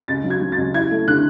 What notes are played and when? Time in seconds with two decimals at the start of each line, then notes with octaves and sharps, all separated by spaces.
0.08 C#2 A6
0.24 F#3
0.30 G#6
0.41 F#3
0.52 C#2 A6
0.74 E4 G#6
0.91 A3
1.08 D3 F#6